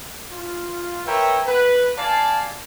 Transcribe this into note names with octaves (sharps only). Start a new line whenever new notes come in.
F4
A#4 B4 C#5 E5 G5
B4
D5 F5 G#5 A5